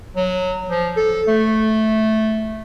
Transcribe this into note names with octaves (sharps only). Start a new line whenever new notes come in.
F#3
F3
A4
A3